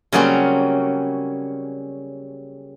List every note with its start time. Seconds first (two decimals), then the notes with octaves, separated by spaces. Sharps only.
0.12 C#3 F#3 G3 A#3 C4 C#4